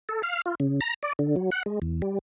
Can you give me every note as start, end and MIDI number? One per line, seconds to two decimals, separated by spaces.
0.09 0.22 69
0.23 0.41 77
0.46 0.55 65
0.60 0.80 49
0.81 0.94 82
1.03 1.13 74
1.19 1.35 50
1.36 1.50 54
1.51 1.63 78
1.66 1.79 56
1.82 2.02 40
2.02 2.19 55